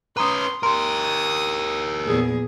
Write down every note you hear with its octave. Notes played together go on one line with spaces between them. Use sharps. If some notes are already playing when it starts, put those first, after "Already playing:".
C#4 B4 A#5 C6 D6 D#6
G4 A#4 C6 D#6
E2 A#2 G#4